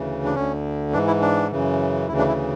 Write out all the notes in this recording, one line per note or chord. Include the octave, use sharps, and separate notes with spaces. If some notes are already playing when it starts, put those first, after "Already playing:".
Already playing: D2 C#3 E3
D4
D2 D3 C#4
G#2 E3 D4
E4
D4
F#2 C#3 E3
D2 C#3 E3 E4
D4
E4